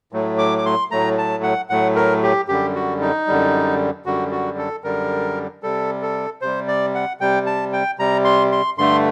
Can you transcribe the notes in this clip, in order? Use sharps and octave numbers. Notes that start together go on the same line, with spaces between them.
A2 F#3 A3
D6
D6
C6
A2 F#3 A3 A#5
A5
F#5
A2 F#3 A3 F#5
A#4
G4
F#2 D3 G3 G4
F#4
D#4
F#2 D3 G3
F#2 D3 G3 F#4
F#4
A4
F#2 D3 G3 A#4
C3 G3 A4
A4
C3 G3 C5
D5
F#5
C3 G3 G5
A5
G5
C3 G3 A#5
C6
C6
G2 D3 A3 C6